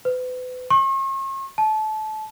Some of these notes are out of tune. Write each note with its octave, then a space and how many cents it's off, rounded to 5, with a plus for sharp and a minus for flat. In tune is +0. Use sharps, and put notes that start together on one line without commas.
B4 +35
C#6 -45
A5 -25